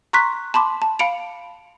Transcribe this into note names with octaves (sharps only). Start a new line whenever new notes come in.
A#5 C6 C#6 F#6 B6
A5 B5 C6 D6
A5
F5 B5 C#7 D7 F7